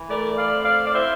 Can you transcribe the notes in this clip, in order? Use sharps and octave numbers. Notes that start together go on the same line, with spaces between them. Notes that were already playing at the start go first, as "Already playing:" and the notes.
Already playing: E3
A3 A#4 D5
D5 F5
C4
D5 F5
D5
E4 C5 E5